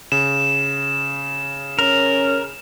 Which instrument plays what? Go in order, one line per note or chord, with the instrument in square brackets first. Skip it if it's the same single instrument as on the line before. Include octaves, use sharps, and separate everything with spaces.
[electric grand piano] C#3 [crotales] E7
[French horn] C#4 [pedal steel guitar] A#4